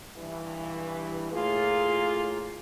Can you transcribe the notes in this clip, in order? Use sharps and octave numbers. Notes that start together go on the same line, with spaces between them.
G2 E3
A2 A#3 F4 G#4